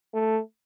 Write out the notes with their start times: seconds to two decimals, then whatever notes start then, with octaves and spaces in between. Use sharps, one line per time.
0.14 A3